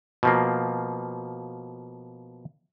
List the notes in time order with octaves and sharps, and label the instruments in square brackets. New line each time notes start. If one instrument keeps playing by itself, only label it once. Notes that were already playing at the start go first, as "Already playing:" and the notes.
[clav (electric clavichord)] B2 F3 A#3